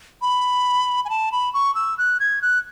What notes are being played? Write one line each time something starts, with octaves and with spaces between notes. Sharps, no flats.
B5
G#5
A5
B5
C#6
E6
F#6
G#6
F#6